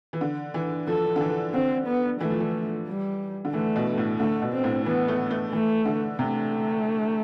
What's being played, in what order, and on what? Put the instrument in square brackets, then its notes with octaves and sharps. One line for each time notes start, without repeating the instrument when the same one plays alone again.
[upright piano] E3
D3
E3
[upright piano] F3 [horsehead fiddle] A4
[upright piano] D3
E3
[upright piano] D3 [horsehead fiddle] C4
[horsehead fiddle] B3
[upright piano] E3 [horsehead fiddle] A3
[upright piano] F3
E3
[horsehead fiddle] G3
[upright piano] D3
[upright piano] E3 [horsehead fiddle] A3
[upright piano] B2
A2
[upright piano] D3 [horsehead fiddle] A3
[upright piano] B2
[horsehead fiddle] C4
[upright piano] A2
[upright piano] E3 [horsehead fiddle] B3
[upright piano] A3
A3
[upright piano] E3 [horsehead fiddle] A3
[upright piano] D3
[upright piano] C3 [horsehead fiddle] A3